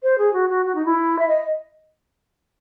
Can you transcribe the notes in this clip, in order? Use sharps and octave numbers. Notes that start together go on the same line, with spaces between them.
C5
G#4
F#4
F#4
F#4
D#4
E4
E5
D#5